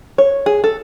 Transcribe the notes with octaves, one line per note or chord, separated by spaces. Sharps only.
C#5
G#4
A4